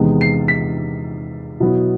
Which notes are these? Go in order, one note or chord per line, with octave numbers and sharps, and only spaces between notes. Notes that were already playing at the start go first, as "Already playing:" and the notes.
Already playing: E2 C3 D#3 G#3 B3
C7
B6
B2 F#3 B3 E4